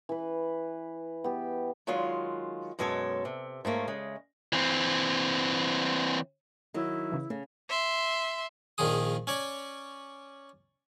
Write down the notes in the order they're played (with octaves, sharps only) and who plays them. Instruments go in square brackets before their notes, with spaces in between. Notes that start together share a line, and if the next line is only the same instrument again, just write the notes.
[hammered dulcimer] E3 B4
B3 G4
[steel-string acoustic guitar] D#3 F#3 G#3 F4 F5
F#2 B2 G#3 A4 C#5
C3
G#2 A3 A#3 C#4
C#3 G#3
[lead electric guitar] E3 C4
[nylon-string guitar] D#3 F#3 [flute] E4
[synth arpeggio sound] C#3 E3
[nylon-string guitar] C#3 [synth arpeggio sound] A3
[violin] E5 C6
[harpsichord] A#1 A#2 D#3 F3 G#4 D#6
C#4 C#5 D5